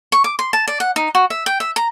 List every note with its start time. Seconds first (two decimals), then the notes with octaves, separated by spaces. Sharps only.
0.12 C#6
0.24 D6
0.39 C6
0.53 A5
0.68 D5
0.80 F#5
0.96 D#4
1.15 F#4
1.30 E5
1.46 G5
1.60 E5
1.76 A#5